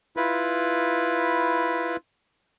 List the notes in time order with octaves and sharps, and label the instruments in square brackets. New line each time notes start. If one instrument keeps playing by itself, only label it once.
[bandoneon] E4 F4 B4